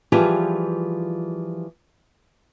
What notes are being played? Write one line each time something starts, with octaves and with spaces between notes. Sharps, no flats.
E3 F3 G3 F4 G4 G#4